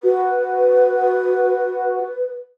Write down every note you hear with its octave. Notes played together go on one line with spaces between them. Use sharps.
F#4 B4